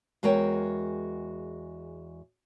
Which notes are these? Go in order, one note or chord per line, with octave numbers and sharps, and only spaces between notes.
E2 G#3 F#4 A#4 C#5 G5